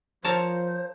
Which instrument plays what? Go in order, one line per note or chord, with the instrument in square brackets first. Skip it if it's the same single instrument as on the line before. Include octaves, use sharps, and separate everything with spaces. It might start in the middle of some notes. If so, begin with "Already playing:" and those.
[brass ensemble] F3 [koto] A#4 C#5 A5 [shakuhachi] C5